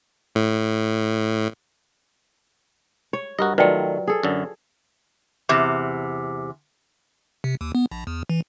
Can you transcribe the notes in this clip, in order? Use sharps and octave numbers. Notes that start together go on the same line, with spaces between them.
A2
C#5
G2 F#4 A#4 D#5
D#3 F#3 A3 F4 B4 D5 G5
G#4 A4
F#2 D3
E2 C3
C3
D#2
B3
A#1
E2
E3